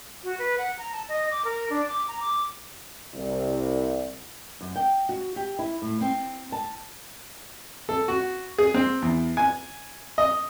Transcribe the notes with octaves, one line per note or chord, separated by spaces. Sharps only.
F#4
B4
F#5
A#5
A5
D#5
D6
A#4
D4
D6
A#5
D6
C2
F#2
G5
F#4
G4
E4
A2
C4
A5
A4
F#4
G#4
C4
E2
G#5
D#5